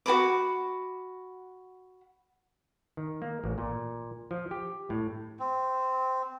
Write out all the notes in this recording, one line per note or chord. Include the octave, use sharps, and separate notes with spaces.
F#4 A#4 B5 D6
D#3
A#3
A1
A#2
F3
G4
A2
C4